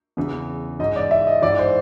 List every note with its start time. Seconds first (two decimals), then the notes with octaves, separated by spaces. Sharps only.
0.17 E2 C#3 E3
0.79 G#2 E3 D#5
0.96 D5
1.11 E5
1.27 D#5
1.42 G#2 E3 D5
1.59 C5